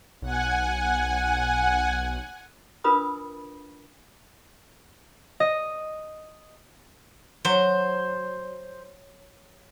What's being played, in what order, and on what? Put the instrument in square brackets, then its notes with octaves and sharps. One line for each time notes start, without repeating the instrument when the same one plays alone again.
[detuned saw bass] B1 [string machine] F#5 G#5
[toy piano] D4 F4 A#4 B4 B5 D#6
[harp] D#5
[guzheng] F#3 [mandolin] C5